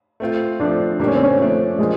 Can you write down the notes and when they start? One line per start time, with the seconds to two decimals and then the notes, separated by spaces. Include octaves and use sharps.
0.20 A3 C4 F4
0.60 F3 A3 C4 D4
0.99 D3 G3 A#3 D4 D#4 G4
1.07 C#4
1.15 C4
1.23 C#4
1.39 F3 A3 C#4 D4
1.78 F3 G#3 A#3 D4 G4